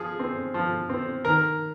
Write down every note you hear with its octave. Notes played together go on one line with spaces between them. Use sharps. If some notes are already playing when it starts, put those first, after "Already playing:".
Already playing: F3 G#4
C4
F3
C4
D#3 A#4